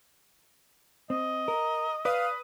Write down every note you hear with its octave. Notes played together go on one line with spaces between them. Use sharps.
C4 D#5
A#4 A#5
B4 D5 F5 D#6